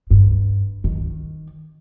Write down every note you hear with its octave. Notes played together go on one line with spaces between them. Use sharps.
G2
D#3